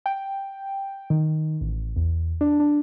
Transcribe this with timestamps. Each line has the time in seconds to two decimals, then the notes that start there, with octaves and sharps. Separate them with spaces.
0.06 G5
1.10 D#3
1.61 A1
1.96 E2
2.41 D4
2.60 D4